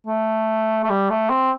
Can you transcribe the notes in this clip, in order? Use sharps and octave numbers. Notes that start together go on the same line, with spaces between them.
A3
A3
G3
A3
C4